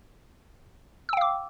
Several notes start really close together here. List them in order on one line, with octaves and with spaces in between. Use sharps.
E6 G5 F5 D6